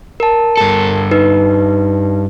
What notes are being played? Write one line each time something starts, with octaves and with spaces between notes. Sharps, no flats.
A#4 A5
G2 A4
D#4 B4